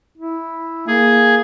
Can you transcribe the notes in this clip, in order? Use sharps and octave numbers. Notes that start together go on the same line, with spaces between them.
E4
A#3 G#4